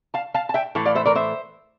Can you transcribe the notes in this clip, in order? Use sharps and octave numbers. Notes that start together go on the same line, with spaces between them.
F5 A5
F5 A5
A5
E5 G5
A2 E3 A3
D5 F5
C5 E5
A#4 D5
C5 E5